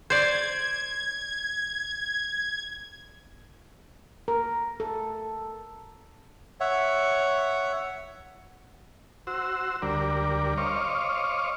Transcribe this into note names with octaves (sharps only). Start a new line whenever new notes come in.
C5 D5 G#6
A#4
A4
C#5 E5 F#5
F#4 C5 E6
D2 G3 A#4 D5
C5 C#5 D#5 F5 C#6 D6